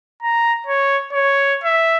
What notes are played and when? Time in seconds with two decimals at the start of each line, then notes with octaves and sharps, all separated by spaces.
0.23 A#5
0.67 C#5
1.13 C#5
1.64 E5